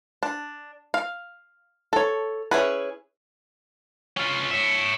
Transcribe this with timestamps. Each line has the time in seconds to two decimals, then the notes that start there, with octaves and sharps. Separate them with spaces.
0.23 D4
0.94 F5
1.93 A4 C#5
2.51 C#4 E4 G#4 B4
4.17 C#4 F4
4.51 C#5 E5